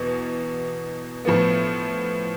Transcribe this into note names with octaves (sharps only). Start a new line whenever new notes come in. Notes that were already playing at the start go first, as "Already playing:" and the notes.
Already playing: E2 B2 B3
A2 F3 B3